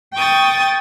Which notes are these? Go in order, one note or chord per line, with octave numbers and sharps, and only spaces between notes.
G5 C#6 D#6 A6